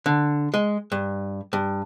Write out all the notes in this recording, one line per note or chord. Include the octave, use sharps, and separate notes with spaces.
D3
G#3
G2
G2